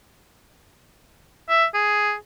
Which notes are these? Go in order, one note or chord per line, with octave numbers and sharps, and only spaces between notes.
E5
G#4